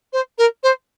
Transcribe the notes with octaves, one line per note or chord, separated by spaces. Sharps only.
C5
A#4
C5